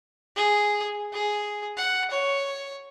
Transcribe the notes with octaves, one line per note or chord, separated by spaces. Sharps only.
G#4
G#4
F#5
C#5